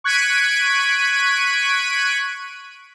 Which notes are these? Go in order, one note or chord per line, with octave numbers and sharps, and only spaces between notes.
C#6 F#6 G#6 B6 D7 D#7